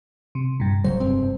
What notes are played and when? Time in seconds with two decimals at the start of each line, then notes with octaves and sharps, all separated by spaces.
0.35 C3
0.60 G2 A#2
0.84 D#1 C#3 F#3 C5
1.00 F1 G2 C4